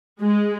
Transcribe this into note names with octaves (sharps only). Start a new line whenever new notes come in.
G#3